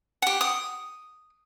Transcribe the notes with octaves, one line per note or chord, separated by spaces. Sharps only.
G4 F#5
D#6